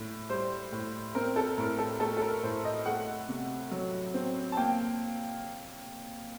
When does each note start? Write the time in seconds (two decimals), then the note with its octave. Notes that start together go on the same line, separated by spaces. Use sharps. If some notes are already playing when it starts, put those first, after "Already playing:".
Already playing: A2
0.30 G3 C5
0.72 A2
1.15 C4 A#4
1.36 A4
1.57 A2 A#4
1.78 A4
2.00 A3 A4
2.17 A4
2.22 A#4
2.43 A2 C5
2.65 D#5
2.86 A3 F#5
3.29 C3
3.71 F#3
4.14 C4
4.52 A5
4.57 A#3 G5